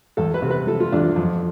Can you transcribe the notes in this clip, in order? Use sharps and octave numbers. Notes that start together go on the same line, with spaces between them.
E2 A4
B4
C3
B4
F3 A4
F4
E2 D4
F2